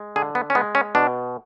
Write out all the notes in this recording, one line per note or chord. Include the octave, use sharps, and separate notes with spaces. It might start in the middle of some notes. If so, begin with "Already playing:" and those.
Already playing: G#3
D3 G#4
B3
C#4
G#3 B3
C#4
B2 D4